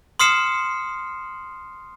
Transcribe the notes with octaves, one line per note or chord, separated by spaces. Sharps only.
C6 D#6 F6 C7 C#7 E7